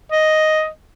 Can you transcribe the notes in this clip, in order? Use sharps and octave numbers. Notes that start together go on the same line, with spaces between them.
D#5